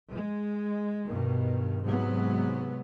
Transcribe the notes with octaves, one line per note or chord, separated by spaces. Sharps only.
G#3
G2 B2 D#3
G#2 C3 F#3 B3